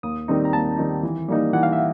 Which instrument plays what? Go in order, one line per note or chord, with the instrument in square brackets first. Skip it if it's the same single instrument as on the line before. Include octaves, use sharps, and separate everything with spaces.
[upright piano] D#2 [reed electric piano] D#6
[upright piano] D#3 G3 C4 D#4
[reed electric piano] A#5
[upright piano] D#2 [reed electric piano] A5
[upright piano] D#3 G3 C4 D#4
E3
G3 A#3 D#4
[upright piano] E3 [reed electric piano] F#5
[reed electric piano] F5
E5